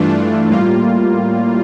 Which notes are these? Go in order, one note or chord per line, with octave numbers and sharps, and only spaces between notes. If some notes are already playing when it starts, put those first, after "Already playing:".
Already playing: G2 E3 A3 D4 F4
A2 G3 A#3 F4